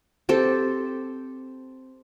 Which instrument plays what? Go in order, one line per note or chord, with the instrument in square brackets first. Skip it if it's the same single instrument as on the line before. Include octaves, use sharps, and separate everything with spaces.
[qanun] C4 G4 A4